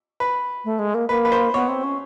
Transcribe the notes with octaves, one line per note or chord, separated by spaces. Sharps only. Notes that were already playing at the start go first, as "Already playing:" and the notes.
B4
A3
G#3
A#3
A#3 B4
B4
C5
B3 C#5
C4
C#4